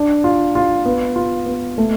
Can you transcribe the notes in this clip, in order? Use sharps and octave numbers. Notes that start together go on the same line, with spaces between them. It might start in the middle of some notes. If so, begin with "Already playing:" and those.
Already playing: D4
F4
F4
B3
F4
B3
A3